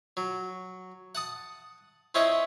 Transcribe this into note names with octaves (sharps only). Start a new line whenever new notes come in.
F#3
F#5 A5 D#6
C4 C#4 E4 C5 C#5 D#5